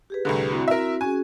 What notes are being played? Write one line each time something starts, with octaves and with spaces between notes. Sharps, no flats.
G4 G#4 B4
C2 A2 D3
C4 E4 F#4
A#4 E5
C#4 F#4 G#4 G#5